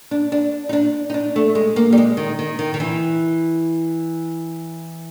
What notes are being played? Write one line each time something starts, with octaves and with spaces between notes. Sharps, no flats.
D4
D4
D#4
D4
D#4
D4
A3
G#3
A#3
G3
G#3
D#3
D#3
D#3
D#3
E3